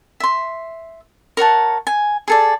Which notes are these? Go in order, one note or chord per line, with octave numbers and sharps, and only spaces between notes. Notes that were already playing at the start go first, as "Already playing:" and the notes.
E5 C6
A#4 C#5 F#5 A5
G#5
G#4 A4 D5